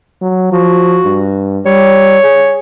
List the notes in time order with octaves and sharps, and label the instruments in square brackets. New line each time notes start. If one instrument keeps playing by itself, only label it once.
[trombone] F#3
[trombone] F3 [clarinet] F#4
[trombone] G2
[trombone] G3 [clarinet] C#5
[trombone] G#4